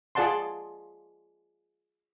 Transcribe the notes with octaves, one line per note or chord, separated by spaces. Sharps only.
F4 G#4 D5 F#5 A5 C6